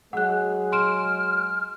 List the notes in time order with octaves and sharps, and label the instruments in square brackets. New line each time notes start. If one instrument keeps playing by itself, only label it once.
[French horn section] F#3 G#3 G#4 [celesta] F#5 F#6
[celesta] C6 D7 E7 [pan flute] F6